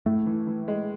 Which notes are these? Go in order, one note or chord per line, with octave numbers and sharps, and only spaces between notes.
A2 A3
E3
E3
G#3